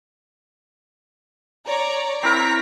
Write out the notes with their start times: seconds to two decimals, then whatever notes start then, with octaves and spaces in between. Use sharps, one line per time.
1.68 C#5 D5 A#5
2.23 C4 E4 A#4 A#5 C#6 B6